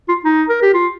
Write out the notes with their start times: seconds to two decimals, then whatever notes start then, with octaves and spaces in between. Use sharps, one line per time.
0.09 F4
0.25 D#4
0.50 A#4
0.62 G4
0.74 F4